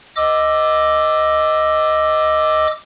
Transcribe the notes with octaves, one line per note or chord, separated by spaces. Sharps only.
D#5 D6 E6